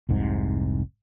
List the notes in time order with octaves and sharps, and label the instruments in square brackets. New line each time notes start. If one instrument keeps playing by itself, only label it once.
[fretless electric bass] F1 C2 G#2 C3